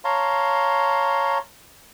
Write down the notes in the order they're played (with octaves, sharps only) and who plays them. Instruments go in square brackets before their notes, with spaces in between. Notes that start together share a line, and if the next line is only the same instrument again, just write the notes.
[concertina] C#5 F5 A5 A#5 C6